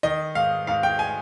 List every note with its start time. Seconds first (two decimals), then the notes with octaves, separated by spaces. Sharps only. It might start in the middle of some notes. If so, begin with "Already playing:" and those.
0.03 D#3 D#5
0.35 G#2 F5
0.67 G#2 F5
0.83 G5
0.99 G#5